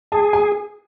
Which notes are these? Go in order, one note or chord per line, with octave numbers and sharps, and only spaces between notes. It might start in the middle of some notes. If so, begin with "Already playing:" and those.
G#4 A5
G#5